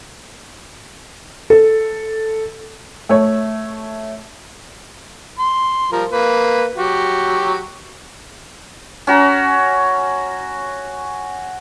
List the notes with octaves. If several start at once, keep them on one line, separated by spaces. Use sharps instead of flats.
A4
A3 C#5
C6
F3 G3 A#4
A#3 B4
F#3 F#4 G4
C#4 F#4 A#5